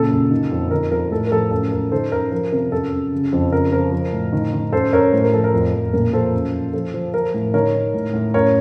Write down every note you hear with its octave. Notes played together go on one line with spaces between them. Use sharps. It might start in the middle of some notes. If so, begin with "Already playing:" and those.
Already playing: A#2 C#3 A4
F#2
D#3
F2
D#3 A#4
F2 A#4
A2 A4
A#4
F3 A4
F#2 A4
F#2 A#4
D#3 A4 C5
F#2 A#4
F3 A#4
C3 A#4
F#2 A4
F#2
C#3
F2
C#3 A#4
F3 A#4
F3
A2
D#3
D#3
F#2 A4 C5
F#2 A#4 C#5
A2 C5
A#4
F3 A4
A#4
F2
F2
A#2 A#4
F3 A4 C5
F#2
F#2
F3 A4
F3
F3 A#4
A2
D#3 A#4 C#5
D#3
A2
A2
F#2 A#4 C#5